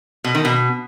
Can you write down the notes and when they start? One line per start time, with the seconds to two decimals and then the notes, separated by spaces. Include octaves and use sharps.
0.24 B2
0.35 D#3
0.45 B2